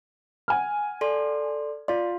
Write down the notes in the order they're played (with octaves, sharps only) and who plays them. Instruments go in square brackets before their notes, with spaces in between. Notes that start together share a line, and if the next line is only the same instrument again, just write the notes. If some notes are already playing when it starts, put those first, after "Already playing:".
[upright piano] F#5 G#5 F6
[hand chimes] A4 D5 C6
[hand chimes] F4 F5 C6 [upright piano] D5